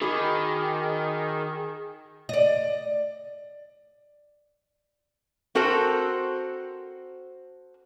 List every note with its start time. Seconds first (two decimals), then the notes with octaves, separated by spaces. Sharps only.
0.02 D#3 F#4 G#4 B5 D6
2.29 D5 D#5
5.55 C4 F#4 A4 A#4 C5